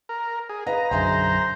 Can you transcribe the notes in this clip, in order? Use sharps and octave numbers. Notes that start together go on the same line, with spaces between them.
A#4
G#4
B4 D#5 F5 A#5
B1 F#2 D3 G#4 C5 E5 G#5